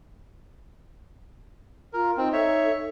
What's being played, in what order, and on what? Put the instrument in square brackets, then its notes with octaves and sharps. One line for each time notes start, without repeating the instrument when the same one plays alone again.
[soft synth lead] F4 [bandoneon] A#4
[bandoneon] C4 [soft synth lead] D#4
[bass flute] A4 [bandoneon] C#5 E5